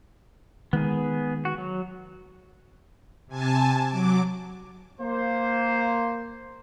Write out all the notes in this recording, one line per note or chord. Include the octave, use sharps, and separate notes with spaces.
D#3 G#3 B3 G#4
F#4
F#3
C3 G#5 A5
F#3 D6
A#3 C5